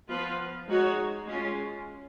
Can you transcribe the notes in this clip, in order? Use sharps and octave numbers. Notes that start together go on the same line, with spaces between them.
F3 B3 F4 B4
G#3 D#4 F#4 C#5
G#3 C#4 F4